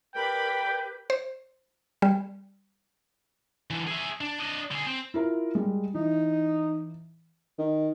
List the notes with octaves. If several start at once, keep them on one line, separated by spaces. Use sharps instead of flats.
G4 A#4 B4 D5 G5 B5 G6
C5
G3
D3 E3
G#4 E5
D4
D4 D#5
D3 G#4
C4
E4 F4 A#4
G3 G#3
E3 D#4
D#3